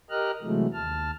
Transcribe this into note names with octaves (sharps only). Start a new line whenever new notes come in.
G4 A#4 D#5 A#5 F6 F#6
C3 E3 F#3 G#3 A3
D#2 A5 F6